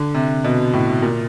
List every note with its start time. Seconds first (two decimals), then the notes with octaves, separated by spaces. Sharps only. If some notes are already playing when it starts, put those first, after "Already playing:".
Already playing: D3
0.14 C3
0.44 B2
0.73 A2
1.02 A#2